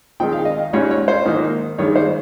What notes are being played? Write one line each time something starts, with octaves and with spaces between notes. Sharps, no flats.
D#3 G#3 C4 D#4 G5
F5
D#5
F5
G#2 G3 C#4 C#5
C#5
C5
G#2 D#3 A#3 D#4
G2 D#3 G#3 C#5
C5